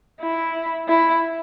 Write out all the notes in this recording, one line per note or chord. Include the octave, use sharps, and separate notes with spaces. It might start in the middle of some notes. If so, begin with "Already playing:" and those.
E4
E4